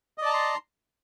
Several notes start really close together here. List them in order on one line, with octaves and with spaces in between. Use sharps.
D#5 D5 A5 A#5 C6